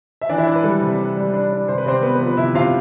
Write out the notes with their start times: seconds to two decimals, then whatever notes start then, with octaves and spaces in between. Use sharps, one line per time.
0.21 E5
0.29 E3 D4 D5
0.38 E4 E5
0.47 E3 D4 D5
0.56 B4
0.64 G3 A4
0.82 C3
0.99 D4
1.17 G3
1.34 D4
1.51 D4
1.68 C3 C5
1.78 B4
1.86 C3 C4 C5
2.03 B3 B4
2.15 B4
2.21 F3
2.27 B4
2.37 C3 E4 E5
2.55 C3 F4 F5